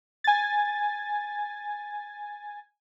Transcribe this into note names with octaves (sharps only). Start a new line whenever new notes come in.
G#5 A6